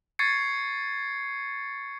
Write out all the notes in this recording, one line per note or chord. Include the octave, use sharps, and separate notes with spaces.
C#6 G#6 A6 C7 C#7